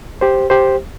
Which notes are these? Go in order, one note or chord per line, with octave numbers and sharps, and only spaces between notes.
G4 C5
G4 C5